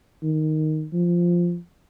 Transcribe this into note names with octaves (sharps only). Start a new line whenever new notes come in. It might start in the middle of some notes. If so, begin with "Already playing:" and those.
D#3
F3